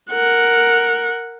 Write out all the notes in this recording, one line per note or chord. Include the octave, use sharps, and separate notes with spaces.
A#4 F#5